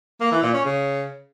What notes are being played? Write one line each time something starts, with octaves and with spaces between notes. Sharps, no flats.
A#3
E3
A#2
C#4
C#3